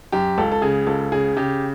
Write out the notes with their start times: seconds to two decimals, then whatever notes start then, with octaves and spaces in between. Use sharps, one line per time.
0.12 F#2 G4
0.38 C#2 A4
0.52 A4
0.62 C#3 G#4
0.87 C#2 A4
1.12 C#3 G#4
1.37 C#3 G4